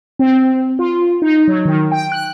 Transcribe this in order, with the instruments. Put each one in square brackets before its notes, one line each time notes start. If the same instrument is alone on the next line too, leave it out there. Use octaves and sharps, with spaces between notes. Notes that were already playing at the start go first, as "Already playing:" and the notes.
[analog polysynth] C4
F4
D#4
F#3
D#3
G5
F#6